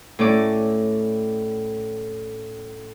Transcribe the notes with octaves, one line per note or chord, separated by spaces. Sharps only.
A2 C#4 D5